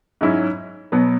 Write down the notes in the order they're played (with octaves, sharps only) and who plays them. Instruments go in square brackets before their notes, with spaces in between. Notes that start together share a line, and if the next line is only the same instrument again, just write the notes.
[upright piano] G#2 F#3 C#4 E4
B2 F#3 B3